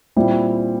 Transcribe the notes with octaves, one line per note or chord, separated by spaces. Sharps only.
A#2 G3 C4 E4